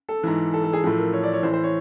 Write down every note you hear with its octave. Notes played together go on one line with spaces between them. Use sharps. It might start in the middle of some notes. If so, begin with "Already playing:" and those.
A4
G#2 E3
A4
A4
G#4
A2 F3 A4
A#4
C#5
D5
C#5
A2 E3 C5
C5
C#5